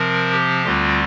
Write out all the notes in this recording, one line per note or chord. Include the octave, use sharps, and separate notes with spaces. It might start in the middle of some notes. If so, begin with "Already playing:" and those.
Already playing: C3 F3 C4 A#4
G4
D2 D3 G3 C4 F4